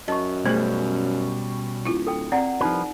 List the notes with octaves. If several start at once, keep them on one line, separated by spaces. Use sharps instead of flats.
F#2 D#5 A5 C#6
B2 G3 A3 C#4 G#4 C5
D1 E4 F4
A4 G5
C4 D5 F#5 A#5
C2 F3 D#4 F4 B4